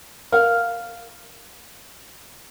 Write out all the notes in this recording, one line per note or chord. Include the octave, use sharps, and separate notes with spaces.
A#4 F5 F#5